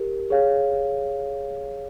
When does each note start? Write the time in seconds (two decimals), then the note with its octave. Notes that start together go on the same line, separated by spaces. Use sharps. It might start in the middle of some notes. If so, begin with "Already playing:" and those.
Already playing: G4 A#4
0.30 G#4 C#5 F5